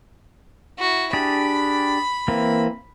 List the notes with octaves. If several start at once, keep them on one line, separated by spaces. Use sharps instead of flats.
E4 F#4
D4 G4 G#4 B5
E3 A#3 C4